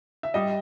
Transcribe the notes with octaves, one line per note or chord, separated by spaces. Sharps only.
E5
G3 D#5